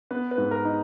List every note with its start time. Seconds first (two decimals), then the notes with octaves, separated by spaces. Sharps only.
0.11 B3 B4
0.31 B4
0.38 G#2
0.51 A#4
0.65 D#4